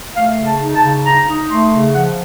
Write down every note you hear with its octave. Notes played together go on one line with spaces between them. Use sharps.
A3 F5
C#3
A5
D#4
A5
C#3
D#4 A#5
D#4
A3 C6
C#3
F3 F#5